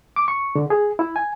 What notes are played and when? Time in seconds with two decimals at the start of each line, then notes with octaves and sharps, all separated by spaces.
0.16 D6
0.28 C#6
0.55 D3
0.70 G#4
0.99 E4
1.16 G#5